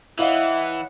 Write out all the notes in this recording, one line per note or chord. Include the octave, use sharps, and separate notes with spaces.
E3 E4 C#5 D#5 F5 F#5